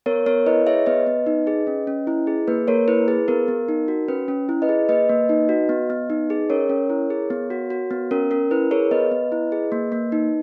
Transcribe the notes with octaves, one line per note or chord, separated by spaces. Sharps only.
B3 A#4 C#5
B3 A#4 C#5
E4 B4 D#5
G#4 C#5 E5
B3 B4 D#5
B3
D#4
G#4
C#4
C#4
E4
G#4
A#3 B4
A#3 A#4 C#5
E4 B4
G#4 B4
B3 A#4
B3
D#4
F#4
C#4 B4
C#4
E4
B4 D#5
G#4
A#3 B4 D#5
A#3
D#4
F#4
B3
B3
D#4
G#4
C#4 A#4 C#5
C#4
E4
G#4
B3
F#4
F#4
B3
C#4 A#4
C#4 A#4
E4 B4
G#4 A#4 C#5
B3 B4 D#5
B3
E4
G#4
A#3
A#3
D#4